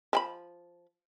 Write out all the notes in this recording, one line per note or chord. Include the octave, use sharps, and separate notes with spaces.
F3 G5 B5